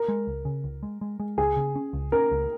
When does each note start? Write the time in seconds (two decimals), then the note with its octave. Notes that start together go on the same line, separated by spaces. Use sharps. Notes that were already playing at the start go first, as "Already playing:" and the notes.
Already playing: A#4
0.08 G#3
0.27 C#2
0.45 C#3
0.64 C#2
0.83 G#3
1.01 G#3
1.20 G#3
1.38 C#2 G#4
1.57 C#3
1.76 C#4
1.93 C#2
2.12 C#4 A#4
2.31 C#2